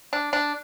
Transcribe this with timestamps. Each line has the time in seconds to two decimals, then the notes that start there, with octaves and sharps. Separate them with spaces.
0.13 D4
0.33 D4